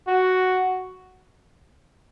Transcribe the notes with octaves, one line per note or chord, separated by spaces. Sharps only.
F#4